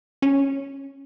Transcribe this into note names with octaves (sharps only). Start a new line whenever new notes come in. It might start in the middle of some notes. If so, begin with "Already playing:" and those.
C#4